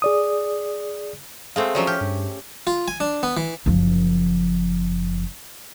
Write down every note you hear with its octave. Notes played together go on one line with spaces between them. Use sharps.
G#4 D5 D#6
G#3 A3 C4 F5
F3 F#3 C#4 D5
G4 F6
G2
F4
G#5
D4
B3
E3
F#1 F3